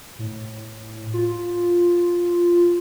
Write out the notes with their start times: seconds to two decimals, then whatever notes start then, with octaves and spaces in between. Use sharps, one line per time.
0.19 A2
1.13 F4